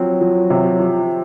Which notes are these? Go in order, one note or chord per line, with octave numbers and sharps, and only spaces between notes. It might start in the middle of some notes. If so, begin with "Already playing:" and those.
Already playing: F3 F#3 C4
F3
C3
F3